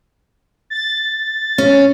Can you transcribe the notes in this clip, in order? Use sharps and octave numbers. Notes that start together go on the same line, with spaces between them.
A6
C#4